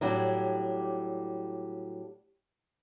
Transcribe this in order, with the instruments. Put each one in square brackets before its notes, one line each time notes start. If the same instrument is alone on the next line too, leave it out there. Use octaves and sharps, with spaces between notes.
[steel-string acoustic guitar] A2 F#3 G3 D4 G4